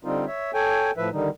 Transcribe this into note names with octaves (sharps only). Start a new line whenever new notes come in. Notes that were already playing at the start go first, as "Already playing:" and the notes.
D3 G3 C4 D#4 F4
C#5 E5
A4 C#5 G5 G#5
A2 F3 B4 E5
D3 D#3 G3 D#4